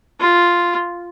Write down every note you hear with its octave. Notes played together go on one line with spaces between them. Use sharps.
F4